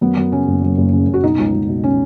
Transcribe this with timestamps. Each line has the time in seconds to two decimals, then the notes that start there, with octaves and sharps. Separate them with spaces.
0.01 F#2 B3
0.17 F#2
0.32 C#3 C#4
0.47 F#1
0.62 F#2
0.78 F#1
0.93 C#3
1.08 F#1
1.14 F#4
1.23 B2 D#4
1.38 C#2
1.53 C#2
1.69 B2
1.84 B2 C#4